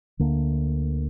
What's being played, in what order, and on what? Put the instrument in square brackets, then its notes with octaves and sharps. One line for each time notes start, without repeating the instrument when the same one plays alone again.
[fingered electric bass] D2 D3 A#3 D4